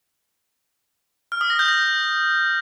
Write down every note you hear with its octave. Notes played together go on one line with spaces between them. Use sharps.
F6
D#6
A#6
G6
A#6